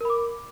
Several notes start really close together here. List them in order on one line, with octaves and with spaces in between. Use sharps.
A#4 B5 D6